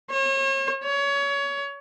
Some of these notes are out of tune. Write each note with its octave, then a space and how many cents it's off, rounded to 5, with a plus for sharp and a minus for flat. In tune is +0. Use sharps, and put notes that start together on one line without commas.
C#5 -40
C#5 +25